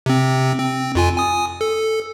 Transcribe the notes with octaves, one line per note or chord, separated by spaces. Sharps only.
C3 C4
C4
F2 F4 G#5
G#5 D#6
A4